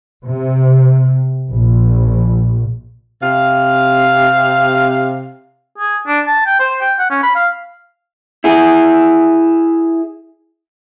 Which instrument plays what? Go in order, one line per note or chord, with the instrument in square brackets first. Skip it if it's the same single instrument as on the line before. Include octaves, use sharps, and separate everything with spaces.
[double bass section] C3
A#1
[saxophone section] C3 F5
[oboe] G#4
D4
A5
G5
C5
G5
F#5
C#4
B5
F5
[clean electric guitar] E4 G#4